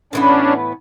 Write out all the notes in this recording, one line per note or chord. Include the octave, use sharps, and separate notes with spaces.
A2 E3 B3 C#4 D4